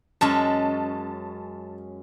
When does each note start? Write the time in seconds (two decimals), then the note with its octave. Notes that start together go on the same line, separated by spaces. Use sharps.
0.21 F#2 G#3 C#4 A5